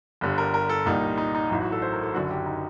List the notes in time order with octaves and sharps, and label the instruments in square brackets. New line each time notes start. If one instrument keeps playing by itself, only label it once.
[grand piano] G1 G2 D3 G3
A#4
A#4
A4
C2 A#2 G3 D#4
D#4
D#4
A1 A2 F#3 D#4
F#4
A4
C5
A#4
A4
F#1 F#2 D3 F#3 F#4
G4
D#4